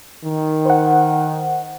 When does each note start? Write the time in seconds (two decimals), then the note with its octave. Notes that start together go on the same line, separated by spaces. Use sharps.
0.24 D#3
0.65 C5 F#5